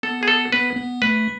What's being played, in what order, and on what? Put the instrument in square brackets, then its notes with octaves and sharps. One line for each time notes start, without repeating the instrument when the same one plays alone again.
[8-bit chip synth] B3 [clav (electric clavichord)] A4
[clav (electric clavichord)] G#4
A4
[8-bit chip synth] B3 [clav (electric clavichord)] B4
[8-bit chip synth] B3
[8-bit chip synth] A3 [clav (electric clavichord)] B4